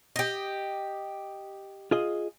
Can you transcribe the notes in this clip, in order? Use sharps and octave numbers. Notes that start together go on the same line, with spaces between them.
G4 D#5
F4 G#4 D#5